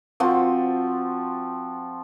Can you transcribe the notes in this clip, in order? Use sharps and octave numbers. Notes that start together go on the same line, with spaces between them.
F3 C4 F#4